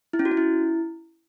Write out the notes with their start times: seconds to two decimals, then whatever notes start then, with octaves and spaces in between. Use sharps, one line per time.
0.13 E4
0.19 C#4
0.25 F#4
0.31 C#4
0.37 E4